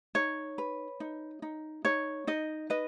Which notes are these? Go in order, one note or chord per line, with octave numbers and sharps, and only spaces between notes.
D#4 C#5
B4
D#4
D#4
D#4 C#5
D#4 D#5
B4 D#5